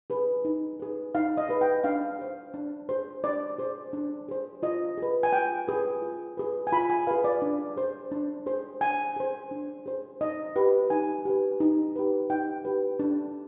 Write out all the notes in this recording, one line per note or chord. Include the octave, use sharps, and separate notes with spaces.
G#4 B4
D#4
G#4 B4
D#4 F5
D#5
G#4 B4
G5
D4 F5
G#4 C5
D4
G#4 C5
D4 D5
G#4 C5
D4
G#4 C5
F4 D#5
G#4 B4
G#5
F4 G5
G#4 B4
F4
G#4 B4
G#5
F4 B5
G#5
G#4 B4 F5
D5
D4
G#4 C5
D4
G#4 C5
D4 G#5
G#4 C5
D4
G#4 C5
D#4 D#5
G4 B4
D#4 G#5
G4 B4
D#4
G4 B4
D#4 G5
G4 B4
D4